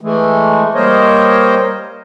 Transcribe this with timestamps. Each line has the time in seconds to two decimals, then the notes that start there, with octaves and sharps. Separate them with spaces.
0.01 E3 G#3 A3
0.75 G3 A#3 A#4 C5 C#5 D#5